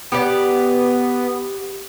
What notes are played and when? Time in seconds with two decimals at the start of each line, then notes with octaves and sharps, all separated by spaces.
0.12 B3 G4 D5